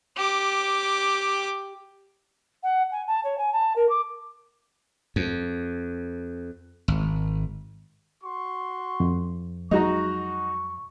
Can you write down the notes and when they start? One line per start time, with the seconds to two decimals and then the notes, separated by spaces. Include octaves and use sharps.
0.17 G4 D6
2.63 F#5
2.91 G#5
3.07 A5
3.24 C#5
3.38 G#5
3.52 A5
3.76 A#4
3.89 D6
5.16 F2
6.88 G#1
8.23 F#4 C6 C#6
9.00 F2
9.71 F#3 G#3 D#4 F#4 A#5 C#6